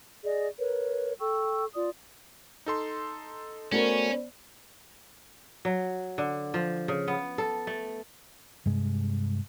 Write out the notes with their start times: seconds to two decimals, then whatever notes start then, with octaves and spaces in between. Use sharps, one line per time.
0.24 G#4 D5 D#5
0.59 A#4 B4 C#5
1.19 A4 G5 C#6 E6
1.74 F4 D5 D#6
2.66 D#4 A4 C6
3.72 A3 B3 C#4 F#4 A#4 C5 D5
5.65 F#3
6.18 D3
6.54 F3
6.88 C#3
7.08 B3
7.38 A4
7.67 A3
8.66 G2 C3 G#3